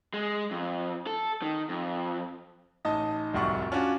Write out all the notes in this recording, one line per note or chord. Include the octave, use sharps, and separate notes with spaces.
G#3
F2
A4
D#3
F2
A1 D#4 D#5 A5
D1 C2 F2 G3 F#5 C#6
C#4 D4 F4 F#4